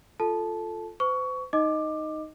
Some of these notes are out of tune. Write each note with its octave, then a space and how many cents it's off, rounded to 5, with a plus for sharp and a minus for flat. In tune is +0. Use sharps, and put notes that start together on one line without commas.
F4 +0 A4 +0 A5 -15
C5 -40 C#6 +20
D#4 +0 D#5 +0 D6 +15